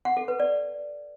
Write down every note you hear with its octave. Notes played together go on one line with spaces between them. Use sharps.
F#5
A4
B4
D5